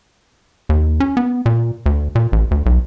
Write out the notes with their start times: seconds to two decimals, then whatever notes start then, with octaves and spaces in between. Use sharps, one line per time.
0.69 D#2
1.00 C#4
1.17 B3
1.46 A#2
1.86 D2
2.15 A#2
2.32 A1
2.51 D2
2.66 B1